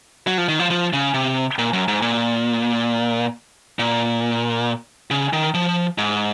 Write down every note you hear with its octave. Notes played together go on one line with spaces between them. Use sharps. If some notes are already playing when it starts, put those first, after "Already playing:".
F#3
F3
D#3
F3
F3
C#3
C3
A#2
F#2
G#2
A#2
A#2
C#3
D#3
F3
G#2